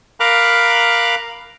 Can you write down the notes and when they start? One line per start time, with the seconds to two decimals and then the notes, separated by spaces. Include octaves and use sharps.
0.20 A#4 F5 A#5 B5 D6 F#6